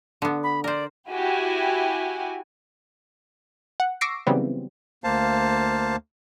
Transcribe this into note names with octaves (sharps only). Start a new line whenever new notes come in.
D3 B3
B5
A#4 C5 D5
E4 F#4 G4 G#5
F#5
C#6 D6 E6 A#6 C7 D7
C#3 E3 F#3 G3 B3 C4
D2 A#3 C5 F5 A5